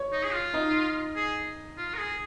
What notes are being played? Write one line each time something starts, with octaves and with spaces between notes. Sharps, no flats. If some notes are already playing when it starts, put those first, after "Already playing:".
Already playing: C#5
D#4
G#4
F4
D#4
G#4
F4
A#4
G#4